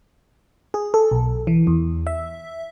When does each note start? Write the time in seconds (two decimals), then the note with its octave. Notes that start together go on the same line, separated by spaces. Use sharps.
0.74 G#4
0.94 A4
1.11 B1
1.47 E3
1.67 E2
2.07 E5